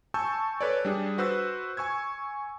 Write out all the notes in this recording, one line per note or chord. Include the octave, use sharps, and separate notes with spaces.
G#5 A5 C#6 E6 G6
A4 B4 C#5 D5
G3 D4 G#4
F#4 B4 C5 E6
G#5 C#6 E6 G#6